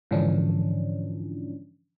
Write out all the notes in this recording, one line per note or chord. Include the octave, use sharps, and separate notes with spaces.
G#2 D3 E3 F3 C#4 D4